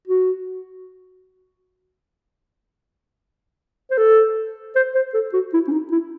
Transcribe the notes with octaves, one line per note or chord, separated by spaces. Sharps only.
F#4
C5
A4
C5
C5
A4
F#4
E4
C#4
D#4
E4